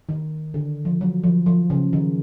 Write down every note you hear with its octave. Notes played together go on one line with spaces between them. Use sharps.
D#3
D3
F3
F#3
F3
F3
C#3
D#3